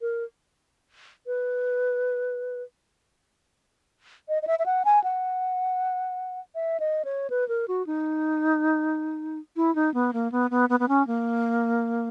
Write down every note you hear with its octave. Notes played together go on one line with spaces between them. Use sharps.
A#4
B4
D#5
D#5
E5
E5
F#5
G#5
F#5
E5
D#5
C#5
B4
A#4
F#4
D#4
E4
D#4
B3
A#3
B3
B3
B3
B3
C#4
A#3